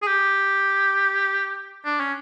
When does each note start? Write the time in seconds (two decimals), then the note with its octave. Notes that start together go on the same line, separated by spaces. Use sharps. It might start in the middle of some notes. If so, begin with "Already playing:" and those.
0.02 G#4
0.07 G4
1.85 D4
2.00 C#4